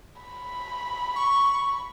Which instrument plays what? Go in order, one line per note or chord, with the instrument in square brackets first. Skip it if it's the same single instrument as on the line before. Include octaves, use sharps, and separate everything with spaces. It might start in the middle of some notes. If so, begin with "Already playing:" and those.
[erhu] B5
[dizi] C#6